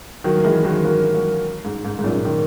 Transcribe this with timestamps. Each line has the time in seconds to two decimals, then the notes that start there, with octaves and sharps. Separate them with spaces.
0.24 D#3 F#3
0.37 A#3
0.44 E3 G#3
0.64 D#3 F#3
0.84 F#3 A#3
1.14 F#3 A#3
1.65 G#2
1.85 G#2
1.99 G#2
2.04 F#2 A#2
2.25 D#3